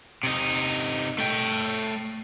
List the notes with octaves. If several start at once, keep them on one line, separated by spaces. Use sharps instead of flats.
C3 D#4
A3 G5